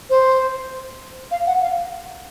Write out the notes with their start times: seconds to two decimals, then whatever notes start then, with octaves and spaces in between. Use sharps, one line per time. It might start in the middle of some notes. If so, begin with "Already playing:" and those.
0.10 C5
1.31 F5
1.47 F#5
1.62 F5